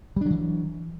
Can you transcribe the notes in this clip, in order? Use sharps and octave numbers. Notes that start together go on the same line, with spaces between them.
E3 F#3 G3 D4